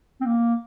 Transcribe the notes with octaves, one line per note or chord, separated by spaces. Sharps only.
C4
A#3